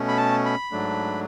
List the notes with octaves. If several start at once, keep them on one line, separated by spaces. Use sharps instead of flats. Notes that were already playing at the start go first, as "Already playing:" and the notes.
Already playing: B2 A3 C#4
B5
A5
B5
G#2 F#3 A3 D4